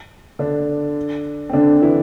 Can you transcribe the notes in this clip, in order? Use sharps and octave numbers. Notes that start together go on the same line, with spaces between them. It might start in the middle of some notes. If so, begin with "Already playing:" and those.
D3 D4
C4
D3 D4
E3 E4